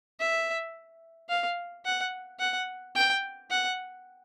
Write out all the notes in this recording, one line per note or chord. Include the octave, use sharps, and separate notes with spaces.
E5
F5
F#5
F#5
G5
F#5